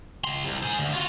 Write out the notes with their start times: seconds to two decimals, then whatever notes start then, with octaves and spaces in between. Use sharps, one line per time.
0.24 C#2 C6
0.45 C2
0.63 G#4 C5
0.78 D2
0.92 F4 F#4